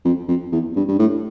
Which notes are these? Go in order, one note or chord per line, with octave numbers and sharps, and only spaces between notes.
F2
F2
E2
G2
G2
A2